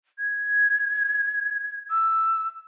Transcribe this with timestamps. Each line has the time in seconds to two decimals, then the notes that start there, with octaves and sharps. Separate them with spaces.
0.18 G#6
1.90 E6